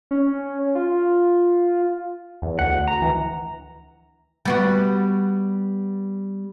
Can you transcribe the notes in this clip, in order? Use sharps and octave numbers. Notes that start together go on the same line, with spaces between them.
C#4
F4
E2
D2 F#5
A#5
E3
G3 B3 F#4